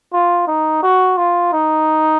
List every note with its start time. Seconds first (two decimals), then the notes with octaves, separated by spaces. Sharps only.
0.13 F4
0.47 D#4
0.82 F#4
1.17 F4
1.53 D#4